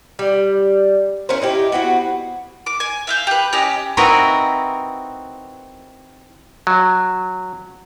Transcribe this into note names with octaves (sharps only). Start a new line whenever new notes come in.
G3
C#4 E4 A#4 C5
D#4 E4 G4
B3 C4 E4 F#4
D6
G#5
E5 F5 G6
G4 B4
C#4 G4 D#5
C4 D#4 E4 F#4 A#4 B4
F#3